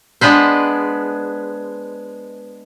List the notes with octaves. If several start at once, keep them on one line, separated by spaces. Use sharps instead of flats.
G#3 B3 D4 B4 C5